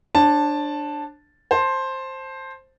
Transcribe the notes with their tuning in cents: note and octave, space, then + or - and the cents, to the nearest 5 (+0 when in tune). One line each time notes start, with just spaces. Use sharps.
D4 +10 C#5 -45 A5 +0
C5 +10 A5 +0